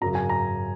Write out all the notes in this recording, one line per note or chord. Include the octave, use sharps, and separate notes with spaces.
G#1 F#2 C#3 F#3 A#5
G#5
A#5